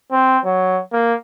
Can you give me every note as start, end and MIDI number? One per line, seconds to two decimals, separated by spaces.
0.12 0.38 60
0.45 0.82 54
0.93 1.15 58